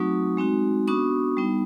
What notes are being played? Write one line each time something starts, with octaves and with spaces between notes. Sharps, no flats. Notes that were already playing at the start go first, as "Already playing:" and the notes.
Already playing: F#3 A3 C4 D#4 F#4 C#6 D#6
G#3 C4 D#4 F#4
B3 D4 F#4 C#6 D#6
G3 B3 D#4